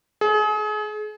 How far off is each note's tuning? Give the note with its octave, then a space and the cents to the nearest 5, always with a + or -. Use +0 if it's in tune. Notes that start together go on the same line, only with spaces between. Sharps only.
G#4 +35